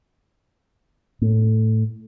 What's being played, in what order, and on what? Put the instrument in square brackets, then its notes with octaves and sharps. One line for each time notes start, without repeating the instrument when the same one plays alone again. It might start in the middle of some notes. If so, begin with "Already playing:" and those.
[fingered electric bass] A2